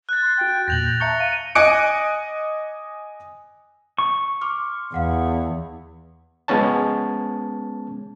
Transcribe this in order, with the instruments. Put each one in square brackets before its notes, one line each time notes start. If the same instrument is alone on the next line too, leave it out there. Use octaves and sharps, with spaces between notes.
[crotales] F#6 A6
[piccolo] C6
[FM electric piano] F#4 G6 [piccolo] G5
[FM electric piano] E2 A#2 [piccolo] G6 [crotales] A#6 F7 F#7
[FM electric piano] E5 A5 C#6 [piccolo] A#5 [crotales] C#7 G7
[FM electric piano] F5 [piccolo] D#7
[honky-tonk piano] D#5 G#5 D6 F#6 C#7 D7
[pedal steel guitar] C#6
[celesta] C6 D6 F6
[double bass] E2 [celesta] F5 F#5
[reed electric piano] G#3 B3 C#4 C#5 A5